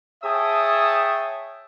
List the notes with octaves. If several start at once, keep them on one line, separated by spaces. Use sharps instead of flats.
G#4 C#5 E5 G5 A5 D#6